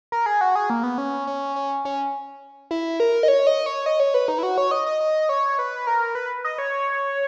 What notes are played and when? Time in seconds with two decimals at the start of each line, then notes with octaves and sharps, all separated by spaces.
0.12 A#4
0.26 G#4
0.41 F#4
0.56 G#4
0.70 A#3
0.83 B3
0.98 C#4
1.27 C#4
1.56 C#4
1.85 C#4
2.71 E4
3.00 A#4
3.23 D#5
3.28 C#5
3.47 D#5
3.66 C#5
3.86 D#5
4.00 C#5
4.14 B4
4.28 D#4
4.38 E4
4.43 F#4
4.58 C#5
4.71 D#5
4.86 D#5
5.00 D#5
5.29 C#5
5.59 B4
5.87 A#4
6.15 B4
6.45 D#5
6.58 C#5